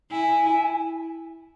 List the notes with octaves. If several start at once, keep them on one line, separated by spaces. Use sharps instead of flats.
E4 G#5